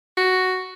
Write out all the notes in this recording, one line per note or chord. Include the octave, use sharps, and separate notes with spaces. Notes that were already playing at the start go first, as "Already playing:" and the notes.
F#4